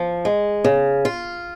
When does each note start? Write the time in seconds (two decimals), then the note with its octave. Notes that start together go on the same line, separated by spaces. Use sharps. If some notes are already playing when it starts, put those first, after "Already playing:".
Already playing: F3
0.25 G#3
0.64 C#3
1.05 F4